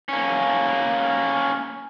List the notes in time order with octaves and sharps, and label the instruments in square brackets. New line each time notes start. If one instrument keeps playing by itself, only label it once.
[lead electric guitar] A#3 C#4